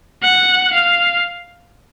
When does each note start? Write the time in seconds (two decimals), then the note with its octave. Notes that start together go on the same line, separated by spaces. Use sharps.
0.22 F#5
0.73 F5